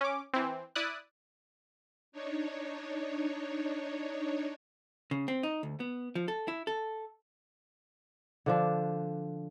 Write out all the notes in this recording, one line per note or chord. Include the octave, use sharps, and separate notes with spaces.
C#4 D6
E3 C4
E4 D5 D#6 F#6
D4 D#4 C#5
C#3
C4
D#4
D2
B3
F3
A4
E4
A4
D3 F3 D4